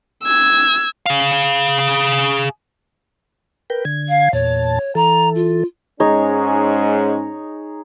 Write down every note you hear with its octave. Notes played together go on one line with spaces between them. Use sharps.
E6 G#6
G#4 F5
A#4 B4 G5
D3 G#6
F5
E2 A#2 C#5 A5
E3 A4 A#5
F4
G#2 G#3 C#4 D#4 G#4 C#5